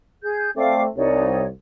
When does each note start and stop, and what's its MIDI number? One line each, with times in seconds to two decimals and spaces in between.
0.22 0.50 68
0.22 0.50 91
0.56 0.86 57
0.56 0.86 60
0.56 0.81 74
0.56 0.81 77
0.56 0.81 86
0.96 1.47 36
0.96 1.44 63
0.96 1.44 73
0.96 1.44 74